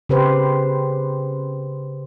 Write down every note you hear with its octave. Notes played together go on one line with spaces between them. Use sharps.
C#3 G4 B4 C5